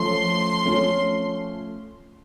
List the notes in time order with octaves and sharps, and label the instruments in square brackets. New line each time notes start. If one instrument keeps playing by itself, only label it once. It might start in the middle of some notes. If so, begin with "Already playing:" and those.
Already playing: [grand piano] F3 A3 C#4 [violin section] C6
[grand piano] F3 A3 C#4